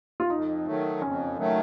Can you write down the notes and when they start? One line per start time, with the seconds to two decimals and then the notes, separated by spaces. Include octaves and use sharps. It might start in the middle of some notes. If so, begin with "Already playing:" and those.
0.20 F4
0.30 F2 D#4
0.66 D#3 F#3 A3
1.02 F2 C#4
1.37 D#3 F#3 A3